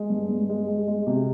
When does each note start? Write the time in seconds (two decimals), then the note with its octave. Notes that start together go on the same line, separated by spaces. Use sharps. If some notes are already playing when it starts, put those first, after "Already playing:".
Already playing: G#3
0.10 G2
0.29 G2
0.49 G#3
0.68 G#3
0.87 G#3
1.07 C3